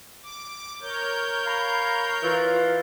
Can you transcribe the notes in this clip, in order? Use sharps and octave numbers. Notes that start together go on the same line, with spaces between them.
D6
A#4 C#5 G6
F5 A#5 B5
E3 F4